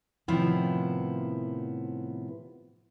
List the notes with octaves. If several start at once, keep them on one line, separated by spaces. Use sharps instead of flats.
A2 C3 D#3 F3 B3 E4